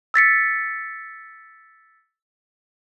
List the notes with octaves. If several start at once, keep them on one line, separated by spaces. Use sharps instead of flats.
E6 A6 B6 C#7